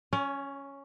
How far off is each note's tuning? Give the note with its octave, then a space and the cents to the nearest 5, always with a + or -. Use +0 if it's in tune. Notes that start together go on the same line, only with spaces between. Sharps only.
C#4 +0 C#5 +35